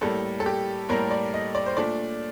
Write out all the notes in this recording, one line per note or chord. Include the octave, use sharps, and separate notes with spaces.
A2 G3 A#3 A4
A4
G4
A2 G3 A#3 A#4
D5
D#5
D5
C5
A#2 A3 D4 D5